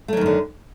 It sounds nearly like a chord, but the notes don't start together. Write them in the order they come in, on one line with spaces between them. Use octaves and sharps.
A3 F#3 D#3 F#2 D3